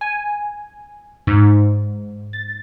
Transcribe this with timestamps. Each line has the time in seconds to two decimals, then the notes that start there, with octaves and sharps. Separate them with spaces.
0.01 G#5
1.27 G#2
2.33 A6